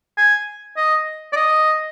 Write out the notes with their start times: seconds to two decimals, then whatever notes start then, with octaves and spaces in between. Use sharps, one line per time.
0.17 G#5
0.77 D#5
1.33 D5
1.36 D#5